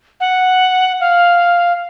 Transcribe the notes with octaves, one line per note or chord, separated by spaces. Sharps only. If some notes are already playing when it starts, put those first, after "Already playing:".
F#5
F5